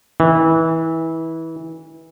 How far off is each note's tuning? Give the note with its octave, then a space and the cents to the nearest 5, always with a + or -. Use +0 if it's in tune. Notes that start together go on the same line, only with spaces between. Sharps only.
E3 -20